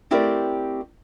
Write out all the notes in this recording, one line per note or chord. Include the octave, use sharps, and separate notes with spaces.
A3 C4 E4 G4 A#4 D5